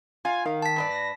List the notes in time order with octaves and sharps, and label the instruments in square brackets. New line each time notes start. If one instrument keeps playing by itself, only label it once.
[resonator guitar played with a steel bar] F4 F5 [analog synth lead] G#5
[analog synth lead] D#3 [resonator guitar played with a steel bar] F5
[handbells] A5 B6
[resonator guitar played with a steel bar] G2 B4 D5
[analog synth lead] A#6